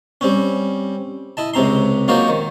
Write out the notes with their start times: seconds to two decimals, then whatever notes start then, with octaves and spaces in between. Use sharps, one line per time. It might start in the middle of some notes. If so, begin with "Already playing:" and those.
0.21 G3 C4 C#4
1.37 E4 D#5 A5
1.54 C#2 C3 C4 A#5 C6
2.08 F#3 A#3 D#4 F4 F#4 C5
2.28 D#3